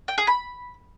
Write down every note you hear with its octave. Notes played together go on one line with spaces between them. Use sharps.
G5
G#4
B5